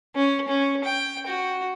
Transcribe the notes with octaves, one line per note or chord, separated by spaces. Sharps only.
C#4
C#4
G5
F#4